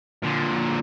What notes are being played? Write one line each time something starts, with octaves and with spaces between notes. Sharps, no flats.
A#2 D3